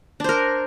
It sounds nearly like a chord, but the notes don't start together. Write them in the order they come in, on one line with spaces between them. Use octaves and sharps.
D4 C5 A#4